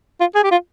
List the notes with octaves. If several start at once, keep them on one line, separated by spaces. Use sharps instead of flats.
F4
G#4
G4
F4